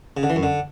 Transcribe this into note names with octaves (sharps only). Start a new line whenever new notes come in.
C#3
D3
E3
F#2
D3